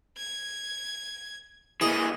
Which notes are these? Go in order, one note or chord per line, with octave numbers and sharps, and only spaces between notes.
G#6
E3 A#3 G#4 D#5 D#7